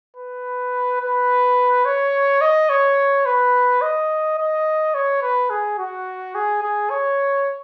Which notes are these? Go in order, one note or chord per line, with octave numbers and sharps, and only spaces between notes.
B4
B4
C#5
D#5
C#5
B4
D#5
D#5
C#5
B4
G#4
F#4
G#4
G#4
C#5